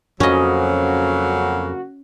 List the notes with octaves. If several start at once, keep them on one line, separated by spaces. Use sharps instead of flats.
F2 C#3 F#3 A#3 C#4 F#4 D#5